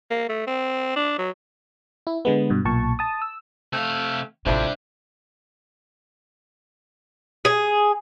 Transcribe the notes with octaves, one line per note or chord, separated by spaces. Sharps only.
A#3
A3
C4
D4
F#3
E4
D3 G#3 B3
G2 B2
B1 A#2 A5 C#6
A5 D#6
E6
C3 A3 F5
A1 F2 C3 G3 D4 C5 E5 G6
G#4